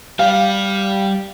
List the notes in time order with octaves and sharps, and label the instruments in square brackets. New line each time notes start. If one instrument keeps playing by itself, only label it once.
[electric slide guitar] G3 G4 [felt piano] F5